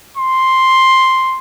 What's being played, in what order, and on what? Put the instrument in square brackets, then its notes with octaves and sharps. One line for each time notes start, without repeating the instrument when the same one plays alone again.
[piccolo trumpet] C6